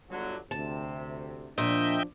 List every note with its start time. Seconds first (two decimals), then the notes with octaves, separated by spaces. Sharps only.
0.10 G1 D3 F#3
0.51 D2 C3 A5
1.58 A#2 F3 D4 D#5 E5 G5